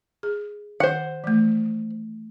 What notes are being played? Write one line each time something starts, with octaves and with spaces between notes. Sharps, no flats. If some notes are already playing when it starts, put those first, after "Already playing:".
G#4
D#3 C5 F#5
E3 A3